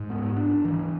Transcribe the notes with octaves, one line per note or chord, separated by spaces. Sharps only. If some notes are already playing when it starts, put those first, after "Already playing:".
Already playing: G#2
B3
D4
E3